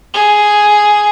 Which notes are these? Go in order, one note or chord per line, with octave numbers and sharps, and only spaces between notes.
G#4